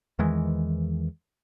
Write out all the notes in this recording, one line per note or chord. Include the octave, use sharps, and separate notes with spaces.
E2 D#3 E3 G#3